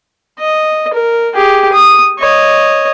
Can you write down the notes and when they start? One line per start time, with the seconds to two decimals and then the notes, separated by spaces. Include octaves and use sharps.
0.39 D#5
0.94 A#4
1.35 G4 G#4
1.72 D#6
2.19 C#5 D#5